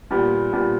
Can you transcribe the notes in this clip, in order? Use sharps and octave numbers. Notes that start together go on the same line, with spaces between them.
A#2 G3 B3
A#2 G3 B3